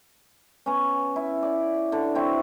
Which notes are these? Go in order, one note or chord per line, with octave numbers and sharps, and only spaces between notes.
B3 C#4
E4
D5 D6
D3
C4 E4 F#4